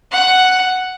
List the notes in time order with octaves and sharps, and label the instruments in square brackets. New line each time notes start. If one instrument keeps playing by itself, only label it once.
[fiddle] F#5